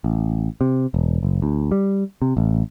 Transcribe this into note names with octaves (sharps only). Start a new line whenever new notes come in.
A1
C3
E1
F#1
D2
G3
C3
A1